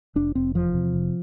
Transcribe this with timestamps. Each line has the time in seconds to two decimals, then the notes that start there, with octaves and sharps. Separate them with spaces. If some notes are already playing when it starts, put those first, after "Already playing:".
0.15 F1 D4
0.35 F1 C4
0.54 E2 F3
0.74 C3
0.94 F1